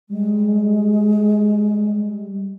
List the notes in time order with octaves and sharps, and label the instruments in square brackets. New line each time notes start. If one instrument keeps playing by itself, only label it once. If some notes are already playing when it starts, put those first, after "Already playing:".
[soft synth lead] G3 [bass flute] G#3